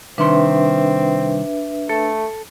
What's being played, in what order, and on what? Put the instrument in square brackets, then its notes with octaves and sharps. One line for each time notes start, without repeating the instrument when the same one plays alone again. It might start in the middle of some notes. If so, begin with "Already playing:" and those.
[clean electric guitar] C2 D#3 C6 [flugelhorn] C4 [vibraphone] D4 B4 E5
[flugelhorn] A3 [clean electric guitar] A4